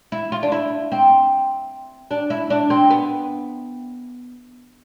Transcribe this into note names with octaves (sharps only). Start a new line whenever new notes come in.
E4
F4
D4
E4
C4
D4
E4
D4
C4
B3